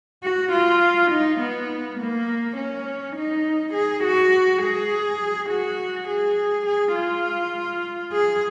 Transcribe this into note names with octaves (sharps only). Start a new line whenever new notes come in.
F#4
F4
D#4
B3
A#3
C#4
D#4
G#4
F#4
G#4
F#4
G#4
G#4
F4
G#4